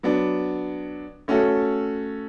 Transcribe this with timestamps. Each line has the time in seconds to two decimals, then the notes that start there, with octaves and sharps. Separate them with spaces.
0.03 F#3 B3 D4
1.28 A3 C#4 F#4 A4